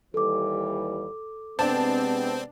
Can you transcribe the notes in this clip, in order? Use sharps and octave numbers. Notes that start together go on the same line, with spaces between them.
D#2 E3 G3 A4 D6
C3 G#3 B3 C4 D4 A5